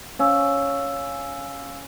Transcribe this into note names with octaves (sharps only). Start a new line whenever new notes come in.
C#4 F5 E6